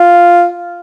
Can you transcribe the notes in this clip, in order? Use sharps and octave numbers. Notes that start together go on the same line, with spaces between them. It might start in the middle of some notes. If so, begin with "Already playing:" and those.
Already playing: F4